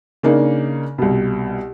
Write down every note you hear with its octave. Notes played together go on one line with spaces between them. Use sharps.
C#3 A#3 D4 D#4
C2 B2